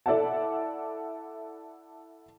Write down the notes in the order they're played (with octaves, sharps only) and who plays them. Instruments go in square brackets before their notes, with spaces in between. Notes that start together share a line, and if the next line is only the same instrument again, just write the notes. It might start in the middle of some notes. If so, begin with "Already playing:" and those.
[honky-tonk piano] E4 A4 D5 E5 F#5 A5